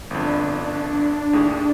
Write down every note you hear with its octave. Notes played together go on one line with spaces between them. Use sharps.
G1 F2 D4
D#2 A2 G#4